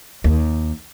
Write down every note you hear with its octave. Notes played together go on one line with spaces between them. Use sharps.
D#2